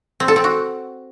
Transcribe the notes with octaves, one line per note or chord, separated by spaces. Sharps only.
C4
A4
C4
F#4